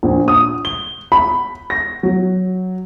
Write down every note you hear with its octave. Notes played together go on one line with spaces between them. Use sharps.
A#1
D#6
G7
B5
A#6
F#3